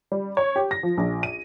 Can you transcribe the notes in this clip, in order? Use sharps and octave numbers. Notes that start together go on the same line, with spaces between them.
G3
C#5
G4
A#6
F3
A#1
D#7